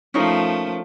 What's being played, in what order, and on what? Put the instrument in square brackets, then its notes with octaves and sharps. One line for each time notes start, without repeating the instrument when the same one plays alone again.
[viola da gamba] F3 A3 [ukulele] C#4 D#4 A#4